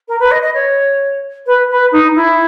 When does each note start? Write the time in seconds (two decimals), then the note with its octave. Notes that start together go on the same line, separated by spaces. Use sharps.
0.08 A#4
0.19 B4
0.31 D#5
0.42 D#5
0.54 C#5
1.46 B4
1.69 B4
1.92 D#4
2.15 E4